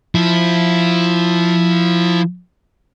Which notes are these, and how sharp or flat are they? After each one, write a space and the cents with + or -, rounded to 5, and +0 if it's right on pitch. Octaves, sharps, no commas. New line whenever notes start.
F3 +0 E4 +0